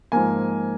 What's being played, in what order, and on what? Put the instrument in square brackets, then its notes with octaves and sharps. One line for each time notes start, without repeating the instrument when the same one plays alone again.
[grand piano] G#2 F3 A#3 G#5